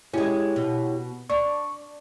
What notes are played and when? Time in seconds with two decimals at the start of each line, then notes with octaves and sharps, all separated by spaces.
0.14 G#3 C#4 E4 G4 C#5
0.56 B2
1.30 D4 C#6